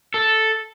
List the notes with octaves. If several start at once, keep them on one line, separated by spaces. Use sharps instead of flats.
A4